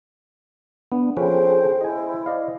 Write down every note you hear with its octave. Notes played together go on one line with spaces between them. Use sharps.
B3 D4
F3 C#4 G#4 A4 B4 C5 G5
E4 C5 D#5 G#5
D5 D#5 F5